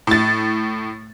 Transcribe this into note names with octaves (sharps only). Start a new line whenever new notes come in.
A2 A6